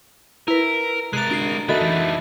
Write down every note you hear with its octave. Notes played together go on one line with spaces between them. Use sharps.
E4 A#4 B4
C3 G#3 A#4 F#6 A6
D4 F#4 C7 D7
D#3 A3 F#4 A4 D#5 E5 B5 A6
E3